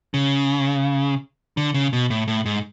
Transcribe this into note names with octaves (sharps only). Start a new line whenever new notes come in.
C#3
D3
C#3
B2
A2
A2
G#2